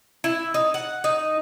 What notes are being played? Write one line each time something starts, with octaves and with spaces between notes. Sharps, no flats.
E4
D#4
F#5
D#4